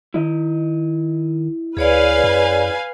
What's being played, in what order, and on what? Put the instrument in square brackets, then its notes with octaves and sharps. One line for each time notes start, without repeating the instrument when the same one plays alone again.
[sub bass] D#3 [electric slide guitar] E4 D#5
[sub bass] D2 [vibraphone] G#4 C#5 D5 [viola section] B4 F5 G#5
[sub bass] F#2